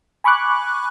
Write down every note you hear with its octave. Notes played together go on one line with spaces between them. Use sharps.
G#5 B5 C#6 D6 F#6